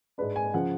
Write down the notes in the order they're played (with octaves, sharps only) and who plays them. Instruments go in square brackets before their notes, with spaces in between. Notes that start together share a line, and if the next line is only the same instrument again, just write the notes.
[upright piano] G#2 G#3 D4 B4
G#5
C#3 F3 F#5